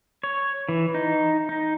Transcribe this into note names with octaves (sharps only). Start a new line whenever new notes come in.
C#5
E3
D#4
D#4